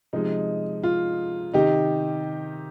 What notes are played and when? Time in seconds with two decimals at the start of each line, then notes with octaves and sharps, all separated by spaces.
0.13 C3 F3 G#3 D#4
0.83 F4
1.53 C3 D#3 D#4 G4